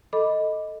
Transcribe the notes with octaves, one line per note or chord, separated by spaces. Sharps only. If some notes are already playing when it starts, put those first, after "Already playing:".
A4 D#5 B5 D6